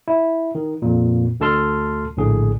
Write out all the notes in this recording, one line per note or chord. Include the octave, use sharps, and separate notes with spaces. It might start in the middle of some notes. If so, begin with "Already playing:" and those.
E4
D#3
F2 A#2
D2 D3 A4 A5 C6 F6
A#1 A2 D3 G#4